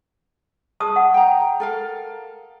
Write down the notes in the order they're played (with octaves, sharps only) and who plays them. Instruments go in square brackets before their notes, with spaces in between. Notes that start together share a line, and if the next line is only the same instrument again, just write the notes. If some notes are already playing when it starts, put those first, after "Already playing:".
[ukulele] G#4 [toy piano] A5 D#6
[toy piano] F#5
[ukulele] G5 A#5
A4 A#4 F5